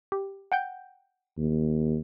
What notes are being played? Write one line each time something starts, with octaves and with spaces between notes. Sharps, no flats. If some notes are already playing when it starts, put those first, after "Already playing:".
G4
F#5 G5 G6
D#2